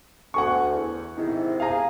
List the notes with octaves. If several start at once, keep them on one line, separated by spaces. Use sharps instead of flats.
D2 F#5 G#5 C#6
E2
G#2 C3 D#3 E4
G#4 F5 A#5